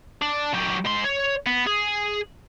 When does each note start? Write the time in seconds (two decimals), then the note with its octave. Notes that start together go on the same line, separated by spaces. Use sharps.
0.22 D4
0.54 F#3 G4
0.85 G#2 C6
1.05 C#5
1.47 B3
1.67 G#4